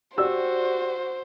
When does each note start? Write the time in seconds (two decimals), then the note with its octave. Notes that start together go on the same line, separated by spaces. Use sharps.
0.18 F#4 G4 C5 D5 E6